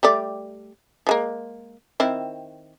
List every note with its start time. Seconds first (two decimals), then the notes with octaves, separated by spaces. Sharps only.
0.03 G3 A3 D5
1.07 F3 G#3 A#3
2.00 D#3 C4 E4